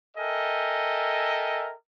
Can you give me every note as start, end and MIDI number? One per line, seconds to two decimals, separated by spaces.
0.17 1.71 69
0.17 1.71 70
0.17 1.71 75
0.17 1.71 76
0.17 1.71 79
0.17 1.71 80